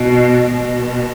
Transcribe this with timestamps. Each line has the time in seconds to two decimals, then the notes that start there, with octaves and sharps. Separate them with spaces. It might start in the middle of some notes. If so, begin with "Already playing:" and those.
Already playing: B2
0.51 B2